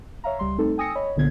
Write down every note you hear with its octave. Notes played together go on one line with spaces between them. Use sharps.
C#5 E5 F5 A#5
C#2 G3 C6
A3 C4 D#4 A4
G5 G#5 D#6 E6 A#6 C#7
C#5 D#5 B5
C2 A#2 D3 B3 G#6